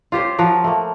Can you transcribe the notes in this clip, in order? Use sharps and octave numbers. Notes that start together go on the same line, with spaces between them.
F4 G4 C5 C#5
F3 F#4 A#4
A3 A#3